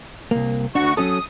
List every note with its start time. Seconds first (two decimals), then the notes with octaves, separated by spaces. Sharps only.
0.31 C2 A#3
0.75 D2 D4 F#4 C#6
0.97 F#3 C#4 A4 D#6